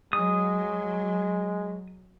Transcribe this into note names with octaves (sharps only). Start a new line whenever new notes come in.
F#3 G#3 D#6